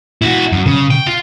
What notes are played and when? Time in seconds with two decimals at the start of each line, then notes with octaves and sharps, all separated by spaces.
0.22 E4 F#4
0.52 F#2
0.66 C#3
0.90 G5
1.06 F4